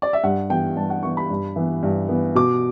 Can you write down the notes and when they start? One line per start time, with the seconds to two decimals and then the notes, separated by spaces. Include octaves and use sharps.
0.02 D5
0.13 E5
0.24 G2 F#5
0.50 E3 B3 G5
0.76 G2 A5
0.90 F#5
1.03 E3 B3 C#6
1.17 B5
1.30 G2
1.56 E3 B3
1.83 G2
2.09 E3 B3
2.35 B2 D6